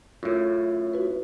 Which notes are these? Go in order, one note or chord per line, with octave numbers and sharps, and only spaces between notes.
F#2 A2 F4
E4 F#4 B4